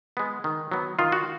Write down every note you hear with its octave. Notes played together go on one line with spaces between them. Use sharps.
G#3 B3
D#3
F#3 B3
D#3 F4
F#4